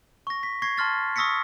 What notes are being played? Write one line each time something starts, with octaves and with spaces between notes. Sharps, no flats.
C#6 A#6
B6
C#6 G#6 A#6 C7
A5 C6 F6 A6
C#6 D#6 E6 A#6 B6 C#7